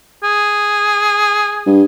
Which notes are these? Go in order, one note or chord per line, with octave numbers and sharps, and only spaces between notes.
G#4
G2